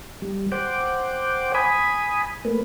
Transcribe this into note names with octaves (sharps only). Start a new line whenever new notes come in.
G3
C5 F#5 G5 D6
G#5 B5 D#6
A3 A#3 B4